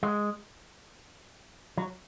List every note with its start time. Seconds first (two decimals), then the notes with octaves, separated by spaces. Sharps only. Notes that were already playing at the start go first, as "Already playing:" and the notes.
0.03 G#3
1.77 F#3